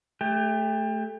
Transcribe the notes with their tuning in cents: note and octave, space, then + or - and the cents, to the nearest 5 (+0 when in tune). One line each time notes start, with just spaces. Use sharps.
A3 -10 G4 +30